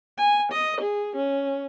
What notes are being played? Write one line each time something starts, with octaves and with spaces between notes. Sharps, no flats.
G#5
D#5
G#4
C#4